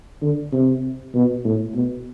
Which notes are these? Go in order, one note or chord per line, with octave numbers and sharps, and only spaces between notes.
D3
C3
B2
A2
B2